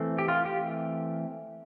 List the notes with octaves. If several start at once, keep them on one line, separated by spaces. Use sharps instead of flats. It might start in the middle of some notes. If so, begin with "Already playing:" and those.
Already playing: E3 A3 C4
G4
F4
G4